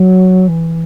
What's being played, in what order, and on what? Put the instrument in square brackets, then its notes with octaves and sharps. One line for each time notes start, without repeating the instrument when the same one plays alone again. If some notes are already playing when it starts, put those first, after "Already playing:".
Already playing: [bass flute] F#3
E3